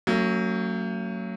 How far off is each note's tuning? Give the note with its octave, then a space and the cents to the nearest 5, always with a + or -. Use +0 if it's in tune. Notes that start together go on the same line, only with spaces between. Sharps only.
F#3 +0 A3 +45 C#4 +0